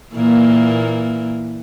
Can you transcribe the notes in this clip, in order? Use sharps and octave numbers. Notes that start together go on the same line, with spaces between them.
A#2 E3 A#3